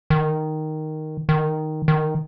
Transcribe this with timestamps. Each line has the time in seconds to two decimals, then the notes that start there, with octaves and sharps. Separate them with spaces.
0.10 D#3
1.29 D#3
1.88 D#3